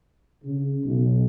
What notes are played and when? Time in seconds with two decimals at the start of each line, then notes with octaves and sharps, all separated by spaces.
0.43 C#3
0.85 B1